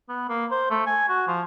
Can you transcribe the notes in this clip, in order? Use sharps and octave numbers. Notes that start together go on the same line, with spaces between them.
B3
A#3
C5
A3
G#5
F#4
F3